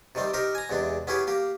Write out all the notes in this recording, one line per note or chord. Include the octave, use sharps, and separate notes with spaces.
C3 D#3 G3 C4
C4 D#4 G4 A#4
G#5 A#5
E2 C3 G#3 D4
B3 C#4 E4 G4 G#4
A#3 G4